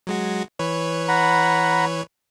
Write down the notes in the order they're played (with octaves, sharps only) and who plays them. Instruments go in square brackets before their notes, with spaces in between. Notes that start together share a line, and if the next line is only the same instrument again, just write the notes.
[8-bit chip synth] F#3 G#3 F#4
E3 B4 C#5
[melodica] F#5 A#5 B5